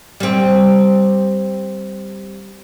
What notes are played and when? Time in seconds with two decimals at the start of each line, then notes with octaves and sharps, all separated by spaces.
0.20 G3 C4